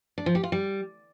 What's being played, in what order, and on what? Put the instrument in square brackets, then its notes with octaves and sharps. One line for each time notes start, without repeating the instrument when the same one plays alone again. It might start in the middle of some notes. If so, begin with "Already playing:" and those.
[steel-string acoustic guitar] D4
F3
G4
F4
G3